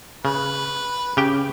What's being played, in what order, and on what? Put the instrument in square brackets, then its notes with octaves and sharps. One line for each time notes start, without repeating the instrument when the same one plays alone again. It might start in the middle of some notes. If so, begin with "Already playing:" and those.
[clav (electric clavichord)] C#3 [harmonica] B4
[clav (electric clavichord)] C#3 G4 G5 [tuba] C#4